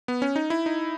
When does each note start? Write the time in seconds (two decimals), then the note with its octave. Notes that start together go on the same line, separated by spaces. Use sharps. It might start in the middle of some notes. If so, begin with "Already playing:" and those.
0.08 B3
0.22 C#4
0.36 D#4
0.50 E4
0.66 D#4